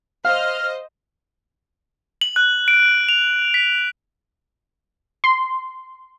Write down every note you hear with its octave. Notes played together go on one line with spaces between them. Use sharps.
C5 D#5 F5 F6
F#7
F#6
D7
F7
B6
C6